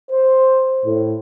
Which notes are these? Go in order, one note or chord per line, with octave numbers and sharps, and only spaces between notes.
C5
A2